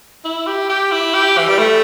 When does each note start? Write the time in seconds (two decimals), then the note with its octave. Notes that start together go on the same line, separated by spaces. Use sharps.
0.25 E4
0.47 G4
0.69 G4
0.92 E4
1.14 G4
1.38 E3
1.48 G3
1.59 A3